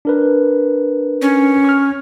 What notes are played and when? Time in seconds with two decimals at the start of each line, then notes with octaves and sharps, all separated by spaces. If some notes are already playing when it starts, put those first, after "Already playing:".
0.05 D4 A#4 B4
1.22 C#4
1.64 C#6 F6